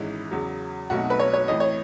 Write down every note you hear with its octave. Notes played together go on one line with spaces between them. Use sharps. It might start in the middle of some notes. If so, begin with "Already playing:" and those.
Already playing: G#1 G#2 E3 G#3 C#4 D#4 E4
E2 C#3 F#3
B1 B2 F#3 A3 D#4 F#4
B4
C#5
C#5
A1 A2 E3 D#5
C#5